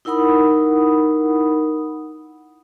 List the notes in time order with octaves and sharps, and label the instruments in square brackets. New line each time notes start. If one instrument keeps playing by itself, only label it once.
[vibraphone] D#4 E4 A#4 F#5 B5 D#6